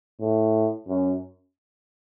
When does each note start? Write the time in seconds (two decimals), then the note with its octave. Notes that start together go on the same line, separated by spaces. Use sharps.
0.21 A2
0.88 F#2